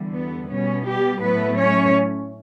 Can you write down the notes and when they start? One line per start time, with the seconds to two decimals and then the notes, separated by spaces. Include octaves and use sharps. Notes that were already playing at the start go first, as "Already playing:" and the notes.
Already playing: E2 D3 G3
0.13 B3
0.49 B2 G3 B3 C#4
0.85 G3 G4
1.21 A2 F#3 A3 B3 B4
1.58 C#4 C#5